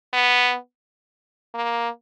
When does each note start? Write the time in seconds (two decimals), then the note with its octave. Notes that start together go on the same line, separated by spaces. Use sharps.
0.13 B3
1.55 A#3